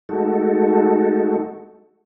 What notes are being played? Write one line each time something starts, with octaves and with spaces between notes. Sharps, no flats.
G#3 A3 D#4 F#4 A4